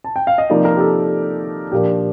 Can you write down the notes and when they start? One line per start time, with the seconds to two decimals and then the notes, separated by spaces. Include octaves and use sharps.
0.04 A5
0.16 G5
0.27 F5
0.38 D#5
0.50 C3 F3 A#3 D#4 D5
0.65 A#4
0.77 G4
0.80 A4
1.72 A#2 F3 A#3 D4 G4